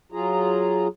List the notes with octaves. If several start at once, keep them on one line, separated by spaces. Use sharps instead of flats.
F#3 F4 G#4 A#5